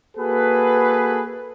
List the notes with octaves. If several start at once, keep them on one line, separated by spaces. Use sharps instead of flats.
A#3 F#4 G#4 A4 B4